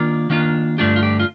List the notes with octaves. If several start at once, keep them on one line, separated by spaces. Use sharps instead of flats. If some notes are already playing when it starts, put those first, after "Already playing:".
Already playing: D#3 A#3 D4 F4
D#3 A#3 D4 F4
G2 D3 A3 D4 F4 G4
F4
G4
F4